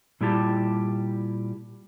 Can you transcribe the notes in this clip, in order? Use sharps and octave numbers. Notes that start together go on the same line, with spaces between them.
A#2 G3 E4 G4 A5